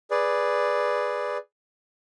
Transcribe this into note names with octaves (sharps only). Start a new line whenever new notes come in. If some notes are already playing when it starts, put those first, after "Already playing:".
G#4 B4 D5